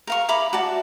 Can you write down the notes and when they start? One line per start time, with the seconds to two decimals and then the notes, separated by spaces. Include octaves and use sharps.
0.07 A#4 F5 C#6
0.29 E4 A#5 B5 D6
0.53 F#4 D5 A5